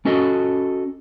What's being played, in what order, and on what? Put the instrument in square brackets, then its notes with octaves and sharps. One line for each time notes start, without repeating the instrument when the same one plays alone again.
[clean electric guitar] C#4 F#4 A4 D#5